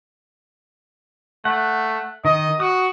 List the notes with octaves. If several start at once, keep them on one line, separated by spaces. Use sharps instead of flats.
A3 F#5
D#3 D#5
F#4 D#6